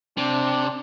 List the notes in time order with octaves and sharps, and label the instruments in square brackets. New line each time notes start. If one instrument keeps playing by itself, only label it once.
[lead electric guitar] C3 [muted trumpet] D4